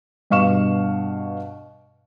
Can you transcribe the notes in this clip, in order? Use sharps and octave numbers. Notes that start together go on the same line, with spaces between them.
G2 B2 F5 C#6 E7